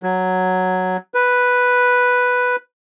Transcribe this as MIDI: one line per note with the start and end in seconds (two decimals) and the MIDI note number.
0.03 0.97 54
1.14 2.56 71